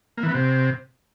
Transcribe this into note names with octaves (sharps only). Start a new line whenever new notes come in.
A#3
E3
B3
C3